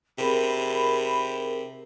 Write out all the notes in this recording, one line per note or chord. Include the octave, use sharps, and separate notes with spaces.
C3 G#4 A#4 B5